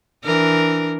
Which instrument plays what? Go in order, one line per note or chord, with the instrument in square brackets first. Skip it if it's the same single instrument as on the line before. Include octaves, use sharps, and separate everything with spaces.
[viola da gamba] E3 D4 A#4